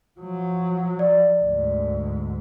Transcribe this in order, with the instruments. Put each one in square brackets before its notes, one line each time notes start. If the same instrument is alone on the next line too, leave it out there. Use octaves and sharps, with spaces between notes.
[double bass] F3 F#3
[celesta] D5
[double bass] D2 G#2